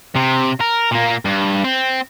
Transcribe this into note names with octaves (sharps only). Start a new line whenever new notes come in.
C3
A#4
A#2 A#3
G2
C4